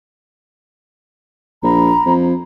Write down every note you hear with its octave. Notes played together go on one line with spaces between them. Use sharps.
A#1 A#5 B5
F2